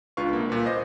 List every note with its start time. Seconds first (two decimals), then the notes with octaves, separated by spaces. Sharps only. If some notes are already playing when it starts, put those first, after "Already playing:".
0.17 C#2 D4 F4 B4 F5 C#6
0.33 C2 A#3
0.49 A#2 B4
0.66 C5 D#5 A#6